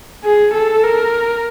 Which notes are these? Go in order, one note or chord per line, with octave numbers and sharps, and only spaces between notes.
G#4
A4
A#4